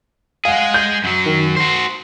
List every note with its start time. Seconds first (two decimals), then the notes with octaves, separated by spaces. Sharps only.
0.45 G#3 G#4 F5 F#5
0.74 G6
1.04 F#2 F#3
1.26 D#3
1.57 F#4 C5 C7